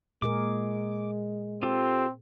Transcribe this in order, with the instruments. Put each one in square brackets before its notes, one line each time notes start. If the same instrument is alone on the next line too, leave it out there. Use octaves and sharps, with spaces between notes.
[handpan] A#2 G#4 A#4 [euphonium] G#3 [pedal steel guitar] D6
[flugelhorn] C4 [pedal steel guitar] F4 G4 A4